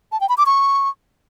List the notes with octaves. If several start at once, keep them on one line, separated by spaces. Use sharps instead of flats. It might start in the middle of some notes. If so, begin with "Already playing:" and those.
A5
G5
B5
D6
C#6